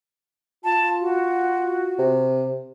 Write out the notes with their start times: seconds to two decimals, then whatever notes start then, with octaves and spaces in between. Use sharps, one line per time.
0.65 F4 A5
1.01 F#4
1.98 C3